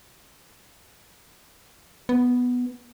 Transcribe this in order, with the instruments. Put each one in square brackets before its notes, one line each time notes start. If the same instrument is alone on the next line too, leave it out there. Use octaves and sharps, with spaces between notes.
[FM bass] B3